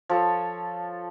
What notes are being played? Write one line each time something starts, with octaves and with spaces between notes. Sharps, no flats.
F3 A4 C#5